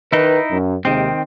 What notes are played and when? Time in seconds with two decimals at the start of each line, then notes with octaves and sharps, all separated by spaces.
0.13 D#3 D#4 E4 B4
0.51 F#2
0.85 D#2 C3 D#3 G#3 C4